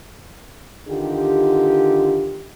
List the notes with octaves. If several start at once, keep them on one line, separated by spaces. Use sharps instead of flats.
D3 D#3 F4 G4